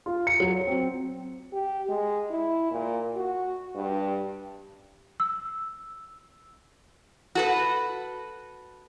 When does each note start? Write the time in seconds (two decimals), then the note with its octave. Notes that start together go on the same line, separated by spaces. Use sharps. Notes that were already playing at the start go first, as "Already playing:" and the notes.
0.06 F4
0.27 C#7
0.40 F#3
0.67 C4
1.53 G4
1.89 G#3
2.30 E4
2.71 A#2
3.16 F#4
3.75 G2
5.20 E6
7.35 F#4 A4 B4